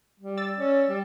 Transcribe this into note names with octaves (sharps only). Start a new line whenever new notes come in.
G3
D5 E6 A6
C#4
G3